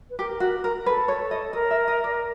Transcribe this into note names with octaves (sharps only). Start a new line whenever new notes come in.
B4
G4 A#4
F#4
A#4
A4 B4
C#5
D#5
A#4 D#5
E5
D#5
D5